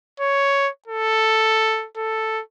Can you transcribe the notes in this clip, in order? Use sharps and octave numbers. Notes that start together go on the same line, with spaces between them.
C#5
A4
A4